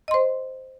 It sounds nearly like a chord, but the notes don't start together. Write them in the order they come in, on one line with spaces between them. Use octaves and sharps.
D#5 C6 C5